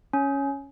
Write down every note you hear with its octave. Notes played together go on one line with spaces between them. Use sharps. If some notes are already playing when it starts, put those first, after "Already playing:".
C#4